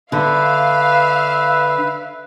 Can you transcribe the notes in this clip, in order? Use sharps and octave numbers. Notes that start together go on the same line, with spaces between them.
D3 B4 E5 F5